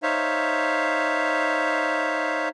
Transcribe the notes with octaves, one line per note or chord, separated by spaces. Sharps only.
D#4 C5 C#5 E5 F5